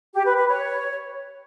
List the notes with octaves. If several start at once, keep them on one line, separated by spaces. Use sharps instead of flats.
G4
B4
B4
C#5